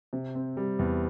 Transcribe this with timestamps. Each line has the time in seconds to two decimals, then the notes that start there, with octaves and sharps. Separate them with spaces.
0.13 C3
0.35 C4
0.57 G3
0.79 E2